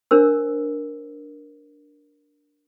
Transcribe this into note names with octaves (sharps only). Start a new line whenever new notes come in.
D4 A#4 C5 E6